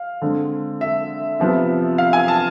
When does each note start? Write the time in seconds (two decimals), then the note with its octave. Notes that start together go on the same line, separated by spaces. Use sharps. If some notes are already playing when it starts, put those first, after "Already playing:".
Already playing: F5
0.22 D3 G#3 C4
0.81 E5
1.40 C3 F3 B3
1.98 F5
2.13 G#5
2.28 A5